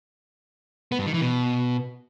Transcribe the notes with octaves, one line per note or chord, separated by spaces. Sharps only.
B3
G2
D#3
E3
B2